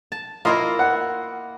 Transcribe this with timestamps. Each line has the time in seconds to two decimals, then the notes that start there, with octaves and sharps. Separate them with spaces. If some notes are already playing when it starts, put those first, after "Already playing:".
0.12 A5
0.45 A#3 E4 F4 A#4 D#5 C6
0.79 F#5